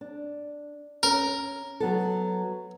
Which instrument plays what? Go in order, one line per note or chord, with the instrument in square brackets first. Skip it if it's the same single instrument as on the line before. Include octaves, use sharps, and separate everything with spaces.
[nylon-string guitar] D4
[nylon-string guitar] C#4 [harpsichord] A#4
[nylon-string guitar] F#3 B3 A4